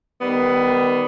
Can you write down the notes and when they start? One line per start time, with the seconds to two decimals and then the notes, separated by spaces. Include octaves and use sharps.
0.21 D#3 G3 B3